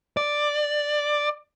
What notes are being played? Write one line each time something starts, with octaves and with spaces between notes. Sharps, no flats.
D5